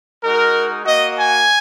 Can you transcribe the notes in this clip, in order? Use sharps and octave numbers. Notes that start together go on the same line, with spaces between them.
G#3 D#4 F#4 A#4
A#3 F#4 D#5
G#5